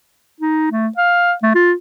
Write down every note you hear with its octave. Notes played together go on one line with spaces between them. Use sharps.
D#4
A3
F5
A3
F4